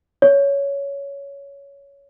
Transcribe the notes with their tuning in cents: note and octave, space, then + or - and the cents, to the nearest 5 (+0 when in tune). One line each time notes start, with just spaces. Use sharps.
C#5 +15